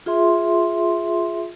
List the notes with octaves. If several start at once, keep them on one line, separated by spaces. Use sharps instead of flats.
F4 G#4 E5 C6